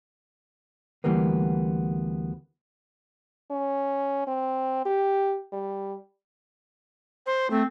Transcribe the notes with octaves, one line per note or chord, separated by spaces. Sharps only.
D2 A2 E3 G3 A#3 B3
C#4
C4
G4
G3
C5
A3 C4